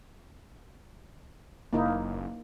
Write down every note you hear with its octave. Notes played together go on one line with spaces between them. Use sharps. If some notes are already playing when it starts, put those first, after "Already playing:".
F#1 A#3 D#4 E4